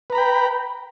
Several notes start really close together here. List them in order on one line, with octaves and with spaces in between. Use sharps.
B4 A#5 B5 G5